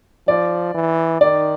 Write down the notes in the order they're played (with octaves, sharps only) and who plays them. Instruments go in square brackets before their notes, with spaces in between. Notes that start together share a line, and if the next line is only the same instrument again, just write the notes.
[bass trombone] F3 [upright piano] D5
[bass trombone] E3
[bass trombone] D#3 [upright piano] D5